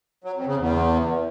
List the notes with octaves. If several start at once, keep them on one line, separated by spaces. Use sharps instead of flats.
F#3
F2
C#3
E2